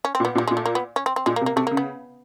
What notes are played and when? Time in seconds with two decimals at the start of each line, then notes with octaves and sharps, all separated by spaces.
0.05 C#4
0.15 C4
0.20 A#2
0.25 B3
0.35 A#2
0.38 G3
0.48 A#2 G#3
0.57 A3
0.66 A#3
0.75 B3
0.96 C#4
1.06 C4
1.16 C4
1.26 A#2 G#3
1.36 A#3
1.41 C3
1.46 A#3
1.56 C3 A3
1.67 A#3
1.71 C#3
1.77 B3